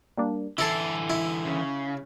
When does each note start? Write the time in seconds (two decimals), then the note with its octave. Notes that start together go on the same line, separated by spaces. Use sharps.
0.17 G3 A#3 D4
0.58 D3 E3 E4 A4 C7 D7
1.10 E4
1.45 C#3